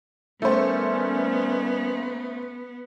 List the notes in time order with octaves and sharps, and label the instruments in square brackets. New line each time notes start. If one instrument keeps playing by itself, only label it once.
[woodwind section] D#3 G3 C#4 [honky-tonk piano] A3 C5 [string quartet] B3